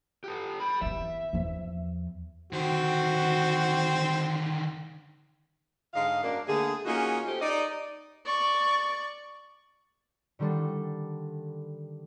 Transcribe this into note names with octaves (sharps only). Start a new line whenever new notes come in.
G4 A4
G4 B5
E3 B3 E5
E2 F3
D3 D#3 C4 F#4
G#2 D3 D#5 F5
F#2 A#3 D4
D3 A3 A#3 G#4
A#3 C#4 D#4 F4 F#4 G#4
A3 C4 G4
D#4 D5 D#5
D5 C#6
D3 D#3 G3 D4 A4